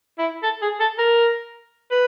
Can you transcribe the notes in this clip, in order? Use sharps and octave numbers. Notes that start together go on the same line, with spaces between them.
E4
A4
G#4
A4
A#4
B4